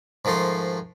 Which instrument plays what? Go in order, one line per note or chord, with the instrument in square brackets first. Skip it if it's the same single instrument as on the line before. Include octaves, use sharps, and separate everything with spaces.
[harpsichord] G#2 D#3 F3 A3 C6